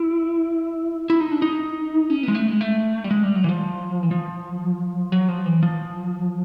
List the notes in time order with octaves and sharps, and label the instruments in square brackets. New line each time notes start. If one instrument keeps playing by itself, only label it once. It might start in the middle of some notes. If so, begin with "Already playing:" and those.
Already playing: [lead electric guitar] E4
E4
D#4
D4
D#4
C#4
B3
G#3
A3
G#3
A3
G3
G#3
G3
F#3
E3
F3
E3
F3
F#3
F3
E3
F3